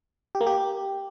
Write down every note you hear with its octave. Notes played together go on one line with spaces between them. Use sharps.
G4
A#3
G4